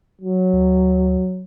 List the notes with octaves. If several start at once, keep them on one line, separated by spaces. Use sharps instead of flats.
F#3
D2